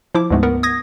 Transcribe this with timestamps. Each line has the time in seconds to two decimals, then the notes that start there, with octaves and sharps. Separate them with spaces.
0.15 F3 E4 D6
0.30 D2 G#2 G#3 A3 B3
0.43 B3 A#4 F#5
0.63 D#6 G#6 A#6